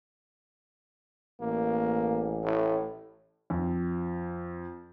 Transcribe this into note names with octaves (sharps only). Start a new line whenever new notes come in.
A1 A#3
A2
F2